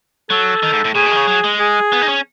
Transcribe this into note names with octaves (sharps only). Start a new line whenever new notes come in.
F#3 A4
D#3
G#2
A2
A2 G#4
B2
D#3
C#3
F#3
G#3
G#4
B3
D#4
C#4